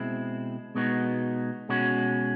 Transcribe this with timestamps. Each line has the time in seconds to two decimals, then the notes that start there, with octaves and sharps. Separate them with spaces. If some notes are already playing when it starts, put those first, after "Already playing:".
Already playing: B2 G#3 C4 E4
0.75 B2 G#3 B3 D#4 F#4
1.69 B2 G#3 C#4 F#4